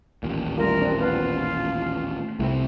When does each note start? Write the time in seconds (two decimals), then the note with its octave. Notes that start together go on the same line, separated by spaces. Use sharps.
0.23 A1 D#2 A#2
0.57 G3 A3 F4 A#4
0.81 C4 D4
0.99 B3 F4 B4
2.39 C2 C3 A3 C4 E4